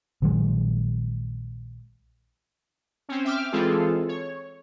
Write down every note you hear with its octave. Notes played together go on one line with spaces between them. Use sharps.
A#1 D#3 F#3 G#3
C4 C#4
E5 G5 D6 F6
E3 G#3 C4 F4 G#4 A4
C#5